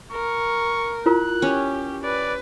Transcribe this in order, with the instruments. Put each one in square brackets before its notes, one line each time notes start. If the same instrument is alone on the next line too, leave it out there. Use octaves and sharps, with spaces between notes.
[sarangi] A#4 [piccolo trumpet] C#6
[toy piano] E4 F4 A#4 [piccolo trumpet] F#6
[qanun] C#4 [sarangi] G4
[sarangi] B4 [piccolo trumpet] D5